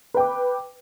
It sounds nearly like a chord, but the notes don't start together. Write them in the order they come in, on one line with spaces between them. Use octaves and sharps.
B4 G5 D6